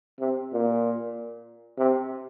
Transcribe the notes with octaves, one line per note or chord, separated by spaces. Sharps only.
C3
A#2
C3